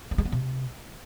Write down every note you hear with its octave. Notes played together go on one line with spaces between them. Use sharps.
A#3
G#3
B3
C3